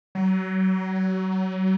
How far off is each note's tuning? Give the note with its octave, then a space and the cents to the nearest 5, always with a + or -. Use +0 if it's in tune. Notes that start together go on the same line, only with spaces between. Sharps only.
F#3 +30